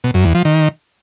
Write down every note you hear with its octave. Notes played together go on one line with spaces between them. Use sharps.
B2
F#2
E2
F3
D#3